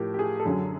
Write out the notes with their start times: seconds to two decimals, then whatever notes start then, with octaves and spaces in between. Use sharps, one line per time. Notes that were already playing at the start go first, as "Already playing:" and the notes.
Already playing: A2 F3 G4 A#4
0.14 G4
0.19 G#4
0.40 A4
0.45 F#2 D3 F#3 G#4